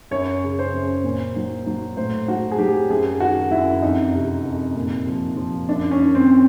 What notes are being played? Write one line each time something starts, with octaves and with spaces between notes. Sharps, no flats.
F#2 C#5
C#3
C5
F#2
A#2
F#3
F#3
A2 C5
F#3 F#4
G#4
F#3 G4
F#2 G#4
D#3 F#4
F#2 E4
F2 D#4
C3
F2
A#2
F3
F3
F#2 D4
C#4
D#3
C4